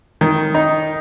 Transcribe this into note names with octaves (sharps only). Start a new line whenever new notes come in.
D#3
D#4